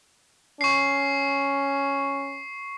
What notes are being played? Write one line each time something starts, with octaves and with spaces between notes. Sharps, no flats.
C#4 C#6 C7